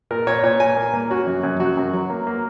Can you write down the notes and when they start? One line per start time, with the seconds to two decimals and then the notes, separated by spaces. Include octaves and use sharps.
0.11 A#2 A#4
0.27 A#2 C#5
0.44 A#2 C#5
0.60 A#2 G#5
0.77 A#3
0.94 A#3
1.10 C#4 F#4
1.27 F#2
1.43 F#2
1.60 F#2 F#4
1.77 F#2
1.93 F#3
2.10 A#3
2.27 A#3